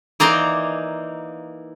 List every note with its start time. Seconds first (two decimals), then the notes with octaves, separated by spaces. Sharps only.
0.20 E3 A#3 D#4 D5 A#5 C6